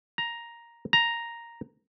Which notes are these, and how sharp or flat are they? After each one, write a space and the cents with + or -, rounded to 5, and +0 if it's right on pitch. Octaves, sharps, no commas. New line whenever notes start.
A#5 +5
A#5 +0